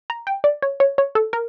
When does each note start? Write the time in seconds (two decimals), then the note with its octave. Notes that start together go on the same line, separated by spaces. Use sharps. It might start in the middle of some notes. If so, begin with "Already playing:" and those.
0.10 A#5
0.27 G5
0.44 D5
0.62 C#5
0.80 C#5
0.98 C#5
1.15 A4
1.33 A#4